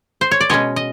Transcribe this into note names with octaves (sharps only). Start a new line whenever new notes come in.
C5
C#5
D5
B2 G#3 C#4 C#5 D#5
D#5